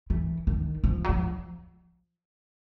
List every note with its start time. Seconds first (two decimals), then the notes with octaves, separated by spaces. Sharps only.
0.10 E3
0.47 D#3
0.84 F3
1.04 F#3
1.09 F3